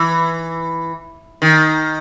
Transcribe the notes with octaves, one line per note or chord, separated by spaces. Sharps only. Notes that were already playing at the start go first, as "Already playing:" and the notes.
Already playing: E3
D#3